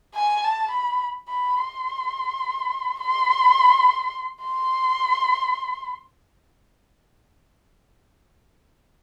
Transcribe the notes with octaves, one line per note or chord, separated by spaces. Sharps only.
G#5
A5
B5
B5
C6
C6
C6